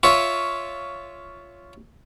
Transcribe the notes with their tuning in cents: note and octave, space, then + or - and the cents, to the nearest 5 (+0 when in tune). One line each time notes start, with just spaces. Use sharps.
F4 +0 C#5 +10 E5 +0